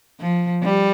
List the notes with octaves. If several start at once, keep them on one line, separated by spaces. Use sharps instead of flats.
F3
G3